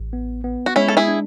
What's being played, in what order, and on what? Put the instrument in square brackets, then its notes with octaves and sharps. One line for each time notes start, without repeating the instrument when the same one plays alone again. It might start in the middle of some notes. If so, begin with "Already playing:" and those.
Already playing: [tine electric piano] A1
B3
B3
[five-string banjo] F#4
[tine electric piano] G#3 [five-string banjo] C#4 E4
[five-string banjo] A4
E4 G#4
[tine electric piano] D4